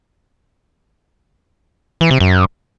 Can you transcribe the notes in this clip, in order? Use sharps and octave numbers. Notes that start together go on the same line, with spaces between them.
E3
C3
F#2